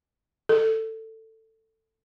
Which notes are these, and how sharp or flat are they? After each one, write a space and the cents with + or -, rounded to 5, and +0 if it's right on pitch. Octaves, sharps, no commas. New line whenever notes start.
A4 +15